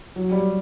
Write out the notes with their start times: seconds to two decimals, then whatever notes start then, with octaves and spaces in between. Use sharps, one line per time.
0.16 F#3
0.31 G3